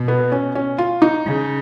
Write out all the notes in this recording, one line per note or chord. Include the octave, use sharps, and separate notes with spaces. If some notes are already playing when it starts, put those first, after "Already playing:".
Already playing: B2
B3
C#4
C#4
F4
D#4
C#3